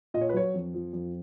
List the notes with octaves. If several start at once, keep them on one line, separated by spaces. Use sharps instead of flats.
A#2 D#5
C#5
B4
F#3 C#5
F2
F3
F2